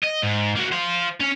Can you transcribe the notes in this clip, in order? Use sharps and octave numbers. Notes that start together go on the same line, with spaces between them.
D#5
G#2
A#3 F#4
C5 F5
C#4